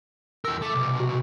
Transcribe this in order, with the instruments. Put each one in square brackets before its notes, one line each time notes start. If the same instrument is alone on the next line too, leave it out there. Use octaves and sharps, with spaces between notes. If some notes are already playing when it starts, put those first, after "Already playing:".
[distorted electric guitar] E2 A#4 [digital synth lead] E6
[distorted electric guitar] A3 [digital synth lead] D6
[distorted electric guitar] C2 B2
[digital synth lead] F#4